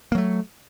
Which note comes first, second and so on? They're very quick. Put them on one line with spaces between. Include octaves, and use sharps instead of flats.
A#3 F#3 A3